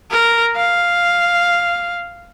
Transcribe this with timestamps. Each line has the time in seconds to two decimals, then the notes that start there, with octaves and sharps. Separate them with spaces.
0.11 A#4
0.56 F5